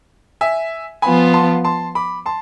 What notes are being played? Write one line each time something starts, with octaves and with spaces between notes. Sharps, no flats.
E5 G#5
F3 B3 F4 G#5 B5
A5 C6
A5 C6
B5 D6
A5 C6